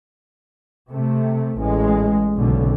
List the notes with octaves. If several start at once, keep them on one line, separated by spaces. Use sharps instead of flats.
C3 A3
A1 G#3
F#1 B1 D3